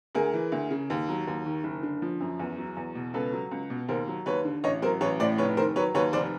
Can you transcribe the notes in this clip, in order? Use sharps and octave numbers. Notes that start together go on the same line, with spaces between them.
D2 G#4 A#4
E3
D2
C#3
D#2
F#3
D#2
D#3
F#1
D3
F3
F#2
E2
F#3
E2
B2
C#2 A4 B4
F#3
C#2
B2
D#2 A#4 C5
F#3
D#2 B4 C#5
D3
A1 C#5 D#5
F#3 A#4 C5
A1 B4 C#5
A2 C5 D5
F1 B4 C#5
D#3 A#4 C5
F#3 B4 C#5
D#2 B4 C#5
F1 C5 D5